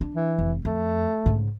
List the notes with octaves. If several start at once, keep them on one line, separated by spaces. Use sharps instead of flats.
D4
E3
F1
F2 A3
G#2 C#3